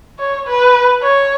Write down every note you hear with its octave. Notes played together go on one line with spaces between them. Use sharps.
C#5
B4
C#5